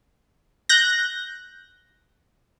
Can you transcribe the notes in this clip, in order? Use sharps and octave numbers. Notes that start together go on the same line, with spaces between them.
F#6 G6 A#6